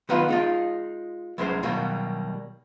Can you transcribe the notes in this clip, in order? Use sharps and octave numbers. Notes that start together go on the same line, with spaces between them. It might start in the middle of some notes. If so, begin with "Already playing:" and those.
D#3 F#3 B3 D#4 F4 B4
G#3 D#4 F4
C2 F#3 G#3 C#4 B4 C5
B2 D#3 F#3 G3 A#3